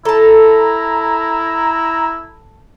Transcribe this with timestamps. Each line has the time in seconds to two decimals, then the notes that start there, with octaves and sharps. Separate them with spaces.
0.05 E4 A4 A5 A#5